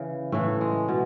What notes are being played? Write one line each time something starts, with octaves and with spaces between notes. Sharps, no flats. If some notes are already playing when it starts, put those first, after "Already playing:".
Already playing: C#3 E3
A2 E3 A3
G#3
B2